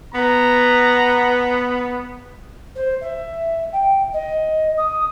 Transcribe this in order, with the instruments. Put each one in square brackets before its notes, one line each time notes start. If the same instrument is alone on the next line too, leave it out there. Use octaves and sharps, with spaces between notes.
[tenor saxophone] B3 [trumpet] A#5
[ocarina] C5
E5
G5
D#5
D#6